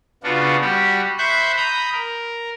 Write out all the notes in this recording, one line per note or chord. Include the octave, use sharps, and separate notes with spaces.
C#3 B3 D4 F4 F#4
G3 F#4 G4
C5 E5 B5 C#6 F#6 G6
A#5 B5 D#6 G6
A#4